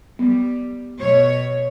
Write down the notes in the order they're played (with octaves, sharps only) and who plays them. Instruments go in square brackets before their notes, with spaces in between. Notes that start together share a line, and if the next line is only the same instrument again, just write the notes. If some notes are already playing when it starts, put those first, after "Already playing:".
[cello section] G3 [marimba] B3
[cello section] B2 C#5